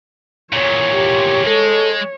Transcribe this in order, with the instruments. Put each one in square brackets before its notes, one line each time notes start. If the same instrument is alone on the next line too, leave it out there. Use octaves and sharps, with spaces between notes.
[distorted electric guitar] E2 A#2 [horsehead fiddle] C#5
[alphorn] G4
[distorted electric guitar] G#3 [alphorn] A4